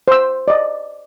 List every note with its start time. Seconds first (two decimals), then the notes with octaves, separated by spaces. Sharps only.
0.08 C5 E6
0.48 D5 D#5